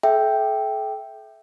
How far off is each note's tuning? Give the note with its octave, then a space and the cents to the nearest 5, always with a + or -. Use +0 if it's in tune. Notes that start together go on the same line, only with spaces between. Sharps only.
A4 -40 E5 +0 G5 +0